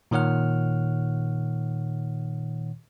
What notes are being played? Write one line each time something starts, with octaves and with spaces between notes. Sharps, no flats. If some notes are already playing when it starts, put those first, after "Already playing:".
A#2 D#3 C#5 F#5 F6